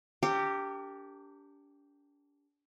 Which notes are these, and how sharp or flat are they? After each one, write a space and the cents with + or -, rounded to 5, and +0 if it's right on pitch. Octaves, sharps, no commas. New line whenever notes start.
D4 -35 G4 +0 A#4 -40